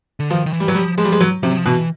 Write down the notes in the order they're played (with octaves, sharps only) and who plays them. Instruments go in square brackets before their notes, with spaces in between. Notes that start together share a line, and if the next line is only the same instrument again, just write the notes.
[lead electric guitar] D3
[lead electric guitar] D#3 [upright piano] F3
[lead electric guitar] D#3
E3
[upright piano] G3
F#3
[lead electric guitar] F3 [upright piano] G3
[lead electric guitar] F3 [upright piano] G#3
[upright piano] G3
G#3
F#3
[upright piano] C3 [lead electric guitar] F3
[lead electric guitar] F#3
F3
[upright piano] B2 [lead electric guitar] E3